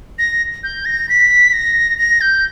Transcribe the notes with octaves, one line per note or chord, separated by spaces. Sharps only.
A#6
G6
A#6
B6
A#6
A#6
G6